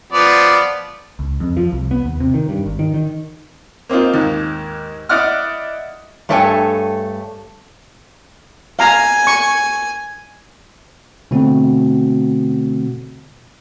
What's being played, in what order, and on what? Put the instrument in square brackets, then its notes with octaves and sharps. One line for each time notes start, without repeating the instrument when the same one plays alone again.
[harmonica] F3 B3 D5
[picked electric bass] C#2
F2
F3
C2
B3
D#2
C3
D#3
G2
G#1
D#3
D#3
[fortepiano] A#3 C4 D#4 F4
D#2 G#2
E4 D5 D#5 F#5 F6
[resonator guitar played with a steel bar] G2 A3 A4 C#5 G5 G#5
[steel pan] F5 A#5 [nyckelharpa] G#5
[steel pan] C#6
[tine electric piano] B2 D3 A3 C4 F#4